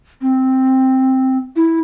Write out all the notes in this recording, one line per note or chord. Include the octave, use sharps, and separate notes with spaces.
C4
E4